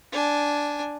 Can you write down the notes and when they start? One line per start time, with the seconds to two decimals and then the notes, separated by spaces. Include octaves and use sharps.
0.12 D4 G#5